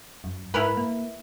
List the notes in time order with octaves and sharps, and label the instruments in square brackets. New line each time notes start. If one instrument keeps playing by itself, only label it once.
[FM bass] F#2
[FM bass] G#2 [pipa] E4 A#4 B4
[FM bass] A#3